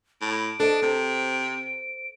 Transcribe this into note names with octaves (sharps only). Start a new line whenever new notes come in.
A2 D7
D4 A4 C5 D#5
C3 C5